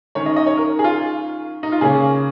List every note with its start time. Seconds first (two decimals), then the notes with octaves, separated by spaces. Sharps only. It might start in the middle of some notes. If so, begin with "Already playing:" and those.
0.15 D#3 C#4 C#5
0.26 D#5
0.36 D#5
0.47 C#5
0.57 A#4
0.79 G#4
0.84 F4
1.63 D#4
1.72 F4
1.81 C#3 A#3 C#4 G#4